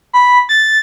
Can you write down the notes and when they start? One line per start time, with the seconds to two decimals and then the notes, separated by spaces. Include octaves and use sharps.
0.13 B5
0.49 A6